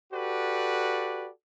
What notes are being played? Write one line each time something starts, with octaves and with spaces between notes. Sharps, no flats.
F#4 G4 A4 B4 D5